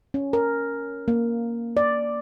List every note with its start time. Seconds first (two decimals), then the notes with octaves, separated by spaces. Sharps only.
0.14 C#4
0.33 A#4
1.08 A#3
1.77 D5